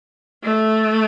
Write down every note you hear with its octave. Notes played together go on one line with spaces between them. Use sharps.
A3